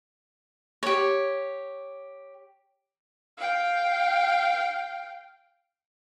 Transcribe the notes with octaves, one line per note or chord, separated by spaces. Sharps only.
G4 C#5
F5 G5